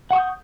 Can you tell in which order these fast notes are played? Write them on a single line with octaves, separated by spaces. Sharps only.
F#5 C#6 D#6 G6